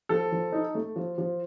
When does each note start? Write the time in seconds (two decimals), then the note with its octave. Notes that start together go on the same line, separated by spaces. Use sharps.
0.09 F3 A4
0.32 F3
0.52 D#4
0.75 A3
0.96 F3
1.18 F3